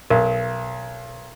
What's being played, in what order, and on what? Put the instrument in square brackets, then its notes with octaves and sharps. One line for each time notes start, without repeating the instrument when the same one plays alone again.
[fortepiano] B1 [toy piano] A#4